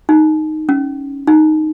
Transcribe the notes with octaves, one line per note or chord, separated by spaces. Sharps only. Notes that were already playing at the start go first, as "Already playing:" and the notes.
D#4
C#4
D#4